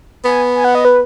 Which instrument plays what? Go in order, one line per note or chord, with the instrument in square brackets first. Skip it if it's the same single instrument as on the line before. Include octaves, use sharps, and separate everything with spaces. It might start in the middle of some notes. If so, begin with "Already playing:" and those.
[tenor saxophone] B3 [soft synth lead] G#5
[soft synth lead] G#5
F#5
D#5
B4